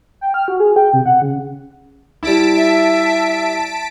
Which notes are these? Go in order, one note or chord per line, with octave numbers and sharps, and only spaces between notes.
G5
F6
F#4
G#4
G5
C3
F#5
C#3
G3 E4 A5 B6 D7
E5